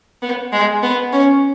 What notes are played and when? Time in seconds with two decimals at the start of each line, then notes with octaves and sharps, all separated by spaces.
0.22 B3
0.53 G#3
0.83 B3
1.13 C#4